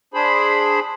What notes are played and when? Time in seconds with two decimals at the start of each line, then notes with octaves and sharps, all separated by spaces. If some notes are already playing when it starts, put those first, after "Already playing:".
0.14 D4 G#4 C5 B5